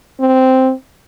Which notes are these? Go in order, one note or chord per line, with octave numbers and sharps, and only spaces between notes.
C4